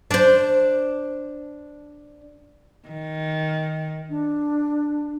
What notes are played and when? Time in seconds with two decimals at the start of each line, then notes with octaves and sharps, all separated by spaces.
0.11 D4 C5
2.88 D#3
4.08 D4